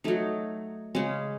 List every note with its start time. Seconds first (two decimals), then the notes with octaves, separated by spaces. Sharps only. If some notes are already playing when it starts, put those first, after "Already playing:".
0.04 F#3 A3 D#4
0.95 C#3 G#3 C#4